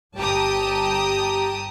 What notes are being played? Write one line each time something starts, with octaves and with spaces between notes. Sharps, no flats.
G1 G4 G5 A5 A#5 D#6